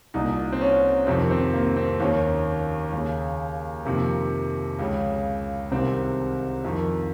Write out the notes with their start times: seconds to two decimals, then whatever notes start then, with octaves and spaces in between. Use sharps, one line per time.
0.14 C2 A#2 D#4
0.52 C4
0.61 C#4
1.07 F2 C3 D#3 C4
1.31 C4
1.54 A#3
1.76 C4
2.00 D#2 D#3 C#4
2.93 D#2 C#3
3.85 F2 C3 D#3 A#3
4.79 C#2 C#3
5.71 C2 C3 D#3 C4
6.64 F2 D#3